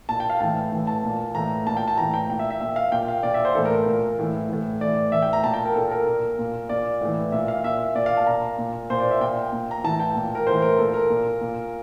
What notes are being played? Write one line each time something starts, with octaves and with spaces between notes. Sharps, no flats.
A#2 A5
G5
F5
A2 E3 A5
A2 E3
A5
A#2
A2 E3 A#5
A#2 A5
G5
A5
A2 E3 A#5
G5
A#2 G5
E5
E5
A#2 E5
F5
A#2 G5
F5
A#2 D5
E5
C5
A2 E3 A4
A#4
A#4
A#2
A2 E3
A2 E3
A2 E3 D5
A2 E3 E5
G5
A#5
A#2 A5
G5
A#4
A#2 A4
A#4
A#2
A#2
A#2 D5
A2 E3
A#2 E5
F5
A#2 E5
A#2 D5
F5
A5
A#2 A#5
A#2
A#2 C5
D5
E5
A#2 G5
A#2
A#5
A2 E3 A5
G5
A#2
A#4
A2 E3 C5
A#4
A#2 A4
A#4
A#2
A#2